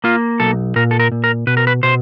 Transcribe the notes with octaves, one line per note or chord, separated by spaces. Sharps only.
A#3 F4
B1 A4
A#2 A#4
A4
A#4
A#2
A#4
B2 B4
A#4
B4
B2 C5